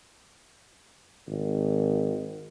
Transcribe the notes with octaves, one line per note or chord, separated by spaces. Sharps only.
G#1